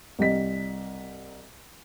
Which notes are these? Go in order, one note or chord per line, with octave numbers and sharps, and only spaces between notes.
C2 G4 D#5 B6